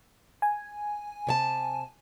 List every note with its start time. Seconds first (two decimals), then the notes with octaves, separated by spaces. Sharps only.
0.42 G#5
1.27 C3 C#5 A5